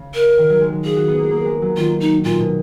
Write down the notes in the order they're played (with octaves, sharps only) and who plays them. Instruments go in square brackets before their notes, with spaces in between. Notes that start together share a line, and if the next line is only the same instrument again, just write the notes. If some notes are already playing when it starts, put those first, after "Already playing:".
Already playing: [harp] C#3
[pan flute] A#4
[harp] D#3
F#3
G#3
G#3
[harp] F4 [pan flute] G#4
[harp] F#4
B3
A#3
A#3
G#3
F#3
[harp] D#3 [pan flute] F4
[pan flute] D#4
[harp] A#2 [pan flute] F4
[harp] B2